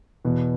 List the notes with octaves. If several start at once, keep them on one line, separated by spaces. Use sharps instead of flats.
E2 B2 B3